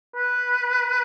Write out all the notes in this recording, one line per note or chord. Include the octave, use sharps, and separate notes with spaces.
B4